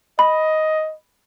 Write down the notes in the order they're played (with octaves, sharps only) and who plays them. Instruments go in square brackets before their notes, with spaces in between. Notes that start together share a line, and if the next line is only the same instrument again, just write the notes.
[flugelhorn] D#5 [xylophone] B5